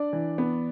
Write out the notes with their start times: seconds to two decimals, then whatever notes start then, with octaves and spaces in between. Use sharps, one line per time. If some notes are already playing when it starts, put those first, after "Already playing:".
Already playing: D4 D5
0.13 E3
0.38 B3